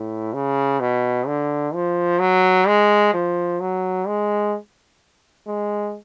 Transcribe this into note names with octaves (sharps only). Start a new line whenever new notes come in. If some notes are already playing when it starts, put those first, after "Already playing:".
Already playing: A2
C#3
B2
D3
F3
F#3
G#3
F3
F#3
G#3
G#3